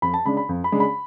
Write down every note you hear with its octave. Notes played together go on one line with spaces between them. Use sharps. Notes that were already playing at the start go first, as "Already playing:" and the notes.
F2 B5
A5
C#3 G#3 D4 B5
B5
F2
B5
C#3 G#3 D4
B5